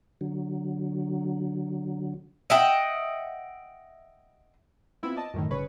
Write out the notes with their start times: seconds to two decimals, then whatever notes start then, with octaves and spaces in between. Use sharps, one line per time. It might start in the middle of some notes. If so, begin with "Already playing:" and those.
0.21 D3 F#3
2.50 D#5 E5 F#5 G5
5.03 B3 C4 E4 F4
5.16 D5 D#5 A5
5.34 F#2 A2 D#3
5.50 G1 C#3 B4 C#5 C#6